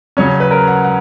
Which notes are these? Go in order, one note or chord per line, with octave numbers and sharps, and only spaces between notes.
C#3 F#3 C#4 C#5
B4
A#4
F#5
F#5